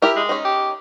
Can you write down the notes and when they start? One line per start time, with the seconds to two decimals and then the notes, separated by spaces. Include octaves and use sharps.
0.02 E4 G4 A#4
0.16 G#3
0.29 C#4 D#4
0.45 G4